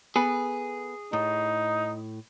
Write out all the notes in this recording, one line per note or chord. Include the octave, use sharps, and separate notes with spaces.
B3 G#4 A4 B4
A2 D#4